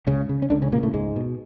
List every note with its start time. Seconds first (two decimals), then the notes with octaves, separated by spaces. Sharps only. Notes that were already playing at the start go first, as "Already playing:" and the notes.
0.07 C#2 C#3 C#4
0.29 C#3
0.42 C#4
0.50 C#2 D3 D4
0.62 C#3 C#4
0.72 A#2 C#3 A#3
0.83 A2 A3
0.94 C#2 G#2 G#3
1.16 B2